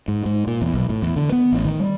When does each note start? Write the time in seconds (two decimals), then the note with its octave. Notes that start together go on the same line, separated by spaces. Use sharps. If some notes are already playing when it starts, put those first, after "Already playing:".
0.08 G#2
0.26 G#2
0.47 A#2
0.62 E2
0.74 B1
0.89 A2
1.02 E2
1.16 D3
1.32 B3
1.52 A1
1.65 D#3
1.79 G3